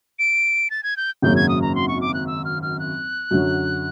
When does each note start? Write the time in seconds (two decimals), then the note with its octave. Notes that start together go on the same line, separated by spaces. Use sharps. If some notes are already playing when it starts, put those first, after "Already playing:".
0.19 D7
0.70 A6
0.83 G#6
0.97 G6
1.22 G#1 F#2 C#3 F#3 A#3 G6
1.36 G#6
1.49 D#6
1.62 A#5
1.75 C6
1.88 C#6
2.01 D6
2.14 F#6
2.27 E6
2.45 F6
2.62 F6
2.79 F#6
3.31 F#2 D3 F#3